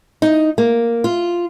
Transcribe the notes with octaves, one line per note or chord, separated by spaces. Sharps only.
D#4
A#3
F4